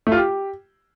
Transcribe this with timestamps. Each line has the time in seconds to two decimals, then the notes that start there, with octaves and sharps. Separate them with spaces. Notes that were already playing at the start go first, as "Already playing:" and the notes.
0.07 A3
0.12 F4
0.17 G4